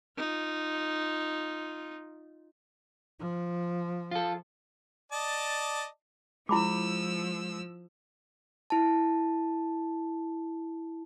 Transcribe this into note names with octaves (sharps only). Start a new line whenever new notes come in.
D#4 F4
F3
F4 A4
D5 D#5 A5
F3 G#3 E4 B5 D6 E6
E4 A5